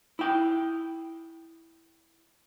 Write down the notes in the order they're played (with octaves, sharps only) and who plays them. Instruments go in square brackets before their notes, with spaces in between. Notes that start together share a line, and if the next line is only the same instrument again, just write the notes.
[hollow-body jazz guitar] E4 G5